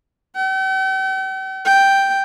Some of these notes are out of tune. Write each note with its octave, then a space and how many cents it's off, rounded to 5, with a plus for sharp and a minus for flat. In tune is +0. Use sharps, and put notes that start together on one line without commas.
G5 -45
G5 +0